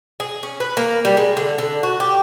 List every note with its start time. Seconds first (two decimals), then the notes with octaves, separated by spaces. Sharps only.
0.20 G#4
0.43 C#4
0.60 B4
0.77 A#3
1.05 G3
1.17 G#3
1.37 D3
1.58 D3
1.83 F#4
2.00 G4